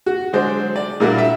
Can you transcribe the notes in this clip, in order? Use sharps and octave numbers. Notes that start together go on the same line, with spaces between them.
F#4
D3 F#3 G#3 D4 C5
D5
A#2 G3 A#3 D4 E4 F#4
E5